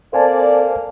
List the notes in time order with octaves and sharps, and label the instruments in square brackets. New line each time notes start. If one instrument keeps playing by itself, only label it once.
[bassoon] A#3 [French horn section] C4 A4 D5 [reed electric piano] C5 G#5 A5